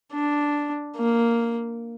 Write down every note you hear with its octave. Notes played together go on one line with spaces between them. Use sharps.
D4
A#3